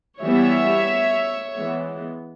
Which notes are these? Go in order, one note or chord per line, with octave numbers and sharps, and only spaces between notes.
E3 G3 B3 C#5 E5
E3 G#3 B3